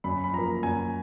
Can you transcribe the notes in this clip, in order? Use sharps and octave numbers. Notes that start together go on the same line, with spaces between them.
F#2 B5
B5
F3 A#3 A#5
F#2 G#5